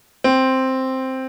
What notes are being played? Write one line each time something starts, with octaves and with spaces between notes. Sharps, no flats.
C4